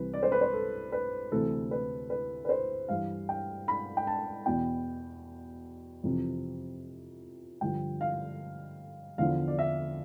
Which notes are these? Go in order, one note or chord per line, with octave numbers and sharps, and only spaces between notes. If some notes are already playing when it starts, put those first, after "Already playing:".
Already playing: C2 C3 E3 B4
D5
C5
B4
C5
A4
B4
D2 C3 E3 A4
B4
B4
B4
C5
G2 E3 F5
G5
B5
G5
A5
E2 B2 G5
F2 C3 E3
G2 D3 F3 G5
F5
E2 D3 F3 F5
D5
E5